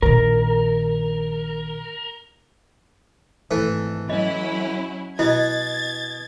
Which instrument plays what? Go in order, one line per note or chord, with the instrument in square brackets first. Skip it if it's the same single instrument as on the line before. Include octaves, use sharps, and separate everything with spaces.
[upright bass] A#1 D#3 [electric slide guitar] A#4
[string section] G#1 [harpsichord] E3 A3
[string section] F#3 C#4 E4 [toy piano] D#5
[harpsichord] B2 [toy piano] E4 D#5 [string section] G#6 A6